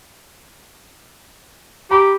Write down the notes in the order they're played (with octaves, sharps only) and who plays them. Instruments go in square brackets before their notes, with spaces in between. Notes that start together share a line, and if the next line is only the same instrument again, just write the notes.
[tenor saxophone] G4 [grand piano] A#5 B5